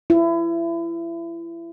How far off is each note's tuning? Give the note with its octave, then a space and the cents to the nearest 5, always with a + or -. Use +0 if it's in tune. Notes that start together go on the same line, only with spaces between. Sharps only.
E4 +30